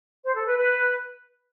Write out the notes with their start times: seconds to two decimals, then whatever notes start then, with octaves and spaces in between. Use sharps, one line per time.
0.25 C5
0.35 A4
0.46 B4
0.57 B4